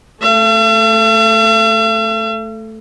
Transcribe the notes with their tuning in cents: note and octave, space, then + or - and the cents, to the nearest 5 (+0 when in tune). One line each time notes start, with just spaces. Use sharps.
A3 +0 E5 +45